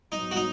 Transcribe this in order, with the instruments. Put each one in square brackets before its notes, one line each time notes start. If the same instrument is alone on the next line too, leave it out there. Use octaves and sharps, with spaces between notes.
[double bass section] G#2 F#3 B3 [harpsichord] D#4
[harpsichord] F#4
D#4